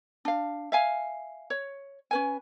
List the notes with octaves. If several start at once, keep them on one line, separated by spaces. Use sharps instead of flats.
D4 F5
E5 F5 G#5
C#5
C#4 B4 G#5